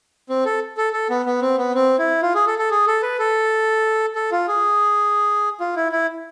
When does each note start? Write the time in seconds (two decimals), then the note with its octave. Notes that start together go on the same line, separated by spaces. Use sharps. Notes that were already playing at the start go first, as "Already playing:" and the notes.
0.29 C4
0.45 A4
0.77 A4
0.93 A4
1.10 B3
1.26 B3
1.41 C4
1.58 B3
1.75 C4
1.99 E4
2.23 F4
2.35 G#4
2.47 A4
2.59 A4
2.71 G#4
2.87 A4
3.03 B4
3.19 A4
4.16 A4
4.32 F4
4.48 G#4
5.60 F4
5.76 E4
5.92 E4